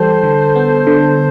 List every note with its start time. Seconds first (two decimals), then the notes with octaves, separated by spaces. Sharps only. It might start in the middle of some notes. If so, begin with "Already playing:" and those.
Already playing: E3 G3 G4 A4 C5
0.23 D3
0.56 B3
0.87 D3